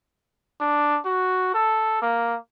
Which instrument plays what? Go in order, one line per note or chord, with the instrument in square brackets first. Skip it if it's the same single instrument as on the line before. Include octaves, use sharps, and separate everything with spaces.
[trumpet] D4
F#4
A4
A#3